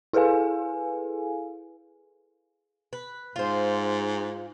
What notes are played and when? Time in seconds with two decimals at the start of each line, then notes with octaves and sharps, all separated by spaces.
0.13 E4 G#4 A4 B4 F5 G#5
2.93 B4
3.36 G#2 F4 C5